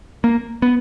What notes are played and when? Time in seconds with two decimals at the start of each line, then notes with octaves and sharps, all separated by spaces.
0.24 A#3
0.62 B3